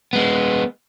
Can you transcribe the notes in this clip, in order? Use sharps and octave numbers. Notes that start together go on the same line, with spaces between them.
G#3 B3